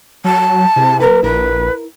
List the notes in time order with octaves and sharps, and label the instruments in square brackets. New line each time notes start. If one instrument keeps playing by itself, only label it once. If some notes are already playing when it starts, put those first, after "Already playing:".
[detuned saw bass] F#3 [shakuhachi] A5
[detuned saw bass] C3 [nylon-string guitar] E4 G#4 C5
[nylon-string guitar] F#3 A#3 B4 [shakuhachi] A#4
[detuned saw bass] A#1 [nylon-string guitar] E4 A#4 [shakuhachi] B4